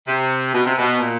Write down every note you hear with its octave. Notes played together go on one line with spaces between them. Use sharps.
C3
B2
C3
B2
A#2